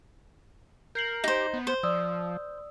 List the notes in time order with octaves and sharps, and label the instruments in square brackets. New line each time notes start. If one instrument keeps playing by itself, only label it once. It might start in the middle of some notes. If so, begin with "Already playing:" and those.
[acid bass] A#4 [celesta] G6 C7 F#7
[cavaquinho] D#4 C5 [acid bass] G4
[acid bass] B3
[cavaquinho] C5
[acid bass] F3 [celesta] D5 D#6 E6